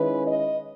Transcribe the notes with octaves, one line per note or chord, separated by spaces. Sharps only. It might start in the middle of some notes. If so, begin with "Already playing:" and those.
Already playing: D#3 G#3 C#4 E4 B4
D#5